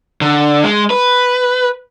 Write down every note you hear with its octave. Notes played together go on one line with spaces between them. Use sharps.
D3
G#3
B4